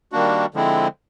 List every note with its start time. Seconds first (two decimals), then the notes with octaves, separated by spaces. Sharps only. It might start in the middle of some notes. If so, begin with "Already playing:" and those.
0.12 D#3 G3 A#3 D4 F#4
0.54 D3 F3 G#3 C4 E4